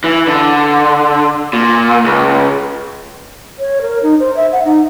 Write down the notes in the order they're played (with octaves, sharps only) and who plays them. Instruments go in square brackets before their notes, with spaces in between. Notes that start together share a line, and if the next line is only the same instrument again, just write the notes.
[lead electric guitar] E3
D3
A#2
C#2
[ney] C#5
A#4
D#4
C5
E5
F#5
D#4